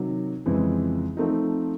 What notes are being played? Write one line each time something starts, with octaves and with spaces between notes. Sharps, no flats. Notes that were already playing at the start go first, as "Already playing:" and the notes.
Already playing: C3 D#3 F#3
F2 C#3 E3 G#3 C4
F3 A3 C4 D#4